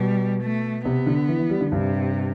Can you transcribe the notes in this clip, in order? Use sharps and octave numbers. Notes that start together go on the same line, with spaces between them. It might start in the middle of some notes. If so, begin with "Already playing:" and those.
Already playing: B2 G3
A3
C3 B3
D3
E3
E3
G3
D3
G2 C3